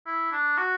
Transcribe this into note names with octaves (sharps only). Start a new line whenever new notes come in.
E4
D4
F#4